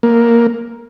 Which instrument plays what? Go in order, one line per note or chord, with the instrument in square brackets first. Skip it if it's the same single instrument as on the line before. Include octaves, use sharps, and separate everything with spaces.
[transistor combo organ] A#3